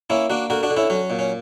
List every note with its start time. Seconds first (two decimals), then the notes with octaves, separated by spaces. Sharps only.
0.10 A#3 C#4 E4
0.30 A#3 D4 F#4
0.50 D3 F#4 A#4
0.63 D4 F#4
0.70 D3
0.77 C#4 E4
0.90 F#3 C#4
1.10 A#2
1.19 C#4